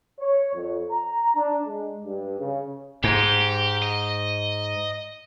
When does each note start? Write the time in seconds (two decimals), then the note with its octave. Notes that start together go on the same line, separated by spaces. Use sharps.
0.20 C#5
0.54 F2
0.90 A#5
1.35 D4
1.66 G#3
2.03 G2
2.39 C#3
3.04 G#2 G4
3.82 D#5